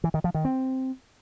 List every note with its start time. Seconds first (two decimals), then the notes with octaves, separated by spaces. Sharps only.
0.04 E3
0.14 D#3
0.24 F3
0.34 D#3
0.45 C4